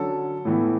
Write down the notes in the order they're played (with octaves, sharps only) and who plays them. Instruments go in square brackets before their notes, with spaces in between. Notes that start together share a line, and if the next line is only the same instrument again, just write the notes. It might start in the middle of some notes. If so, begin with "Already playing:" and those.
Already playing: [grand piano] D3 F#3 C#4 A4
A2 E3 B3